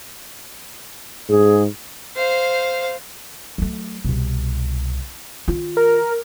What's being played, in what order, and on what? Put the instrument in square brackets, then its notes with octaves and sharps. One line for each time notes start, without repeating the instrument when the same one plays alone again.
[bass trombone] G#2 [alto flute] G#4
[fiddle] C5 F5
[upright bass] F#3 A3
C2 B2
D#3 F4
[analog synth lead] A#4